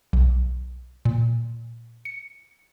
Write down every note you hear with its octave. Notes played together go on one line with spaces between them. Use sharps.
B1
A#2
C#7